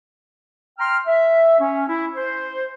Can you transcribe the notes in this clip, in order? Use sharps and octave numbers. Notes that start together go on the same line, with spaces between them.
G5 A#5 C6 F6
E5
C#4
E4
C5